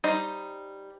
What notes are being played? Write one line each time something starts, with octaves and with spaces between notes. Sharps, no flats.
G3 D#4 C5